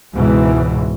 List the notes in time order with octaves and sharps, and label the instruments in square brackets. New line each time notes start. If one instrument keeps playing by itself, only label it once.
[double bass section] C#2 G#2 B2 E3